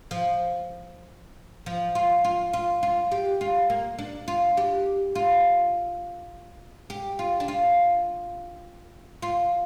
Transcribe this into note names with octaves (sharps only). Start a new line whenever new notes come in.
F3
F3
F4
F4
F4
F4
G4
F4
A#3
D4
F4
G4
F4
G4
F4
D4
F4
F4